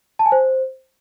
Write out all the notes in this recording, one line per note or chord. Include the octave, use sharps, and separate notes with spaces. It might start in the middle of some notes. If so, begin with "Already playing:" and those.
A5
G#5
C5